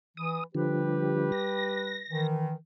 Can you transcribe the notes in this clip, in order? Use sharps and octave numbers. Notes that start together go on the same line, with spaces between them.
E3 D#6
D3 F3 G3 G4 B4
A#6
D#3 E3